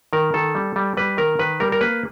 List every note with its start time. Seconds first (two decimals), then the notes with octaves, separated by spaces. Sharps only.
0.13 D#3 A#4
0.34 D#3 A4
0.55 G3
0.76 G3
0.97 G3 B4
1.17 D#3 A#4
1.39 D#3 B4
1.60 G3 A#4
1.72 A#4
1.81 A#3 B4